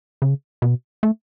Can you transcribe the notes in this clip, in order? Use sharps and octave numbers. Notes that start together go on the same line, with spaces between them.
C#3
B2
A3